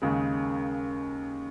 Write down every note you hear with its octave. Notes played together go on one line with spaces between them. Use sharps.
D#2 C#3 G#3